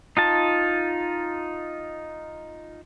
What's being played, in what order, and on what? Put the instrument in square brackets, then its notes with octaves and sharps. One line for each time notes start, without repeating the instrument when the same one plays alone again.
[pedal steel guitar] D#4 F4 A5